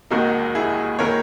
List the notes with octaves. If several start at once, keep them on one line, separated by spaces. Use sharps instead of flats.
E1 D#2 D#3 A#3 D#4 F#4
E4 G#4
D#3 A#3 A#4 C#5